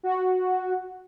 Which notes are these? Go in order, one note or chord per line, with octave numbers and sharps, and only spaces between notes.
F#4